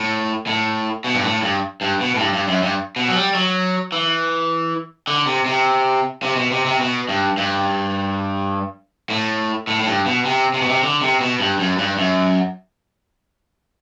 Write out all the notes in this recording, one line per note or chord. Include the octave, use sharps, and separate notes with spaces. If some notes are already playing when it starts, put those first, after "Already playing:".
Already playing: A2
A2
B2
G2
A2
G2
G2
B2
A2
G2
G2
F#2
G2
B2
F#3
G3
F#3
E3
D3
C3
C3
C3
B2
C3
C3
B2
G2
G2
A2
A2
A2
G2
B2
C3
C3
B2
C3
D3
C3
B2
G2
F#2
G2
F#2